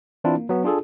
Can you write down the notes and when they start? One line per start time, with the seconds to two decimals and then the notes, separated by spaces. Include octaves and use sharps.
0.24 E3 C4 D4 E4 F4
0.37 A#3
0.49 F#3 B3
0.64 D4 F4 G#4 A4